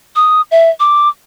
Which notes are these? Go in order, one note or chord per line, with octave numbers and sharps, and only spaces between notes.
D#6
E5
D6